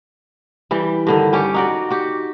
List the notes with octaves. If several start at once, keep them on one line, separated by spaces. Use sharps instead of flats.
E3 G3
G2 D3 D#3
G3 C#4 G4 C#5
D#4 F#4 D5
F#4 G4